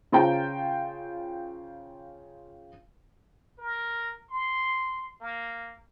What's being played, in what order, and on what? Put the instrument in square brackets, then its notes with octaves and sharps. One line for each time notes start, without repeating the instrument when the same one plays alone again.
[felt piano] C#3 F4 C5 F5 G5 A#5
[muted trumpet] A#4
C6
A#3